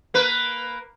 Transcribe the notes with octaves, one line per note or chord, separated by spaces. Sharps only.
A#3 B4